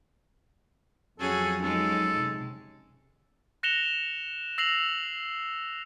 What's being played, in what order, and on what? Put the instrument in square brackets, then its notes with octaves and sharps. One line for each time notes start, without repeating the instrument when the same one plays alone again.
[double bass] F2 F#3 [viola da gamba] C#4 F#4 G#4 [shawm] A4
[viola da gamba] G#3 C#4 D#4 [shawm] A4
[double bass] C3
[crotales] F#6 A#6 C#7 E7 F7 G7
E6 A#6 C7 F7 F#7